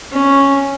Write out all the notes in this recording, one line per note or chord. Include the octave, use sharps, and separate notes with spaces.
C#4